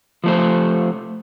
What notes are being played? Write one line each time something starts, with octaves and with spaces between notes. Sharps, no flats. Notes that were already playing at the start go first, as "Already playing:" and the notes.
F3 A3 C5